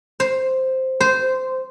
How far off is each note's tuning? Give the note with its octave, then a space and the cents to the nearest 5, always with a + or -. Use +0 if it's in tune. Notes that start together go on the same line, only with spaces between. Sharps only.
C5 +0
C5 -15